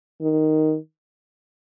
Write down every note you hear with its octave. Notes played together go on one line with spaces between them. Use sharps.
D#3